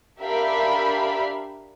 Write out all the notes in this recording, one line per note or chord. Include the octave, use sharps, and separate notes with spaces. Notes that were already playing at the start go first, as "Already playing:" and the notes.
D4 G4 A#4 E5 F5 B5